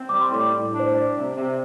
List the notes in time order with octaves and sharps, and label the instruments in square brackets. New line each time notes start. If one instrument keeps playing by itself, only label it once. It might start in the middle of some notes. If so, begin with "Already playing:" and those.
Already playing: [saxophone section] C4
[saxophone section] G3 [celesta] D6
[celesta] C6
[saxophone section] A2 [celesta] D6
[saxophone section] A2
D4
[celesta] C5
[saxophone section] G3 [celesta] D5
[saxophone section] C3
C3